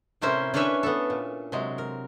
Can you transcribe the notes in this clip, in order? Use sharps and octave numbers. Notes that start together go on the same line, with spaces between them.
A2 C3 C#4 E4 A#4 C5
C#4 D4 B4 C#5 E5 G#5
B3 A4
A#2
C3 F#3 G#3
A#4